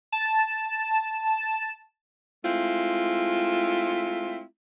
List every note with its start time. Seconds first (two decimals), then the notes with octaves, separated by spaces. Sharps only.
0.12 A5 E7
2.44 G#3 A3 C4 E4 F4